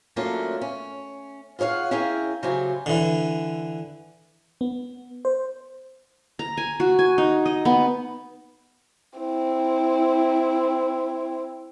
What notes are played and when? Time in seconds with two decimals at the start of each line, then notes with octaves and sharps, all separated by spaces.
0.16 F#3 A3 A#3 C#4 D4 F4
0.61 C#4
1.59 F4 G#4 C#5 F5 F#5
1.91 C#4 E4 G#4 A#4 F5 G5
2.43 C#3 F#3 A3 G4 C5 G#5
2.86 D3 E3
4.61 B3
5.25 C5
6.39 A#5
6.57 G#5
6.80 F#4
6.99 G#5
7.18 D#4
7.46 D#5
7.65 B3
9.19 C4 E4